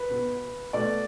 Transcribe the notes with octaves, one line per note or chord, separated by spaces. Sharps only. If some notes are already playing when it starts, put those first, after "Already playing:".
Already playing: B4
B2 B3
B2 A3 D5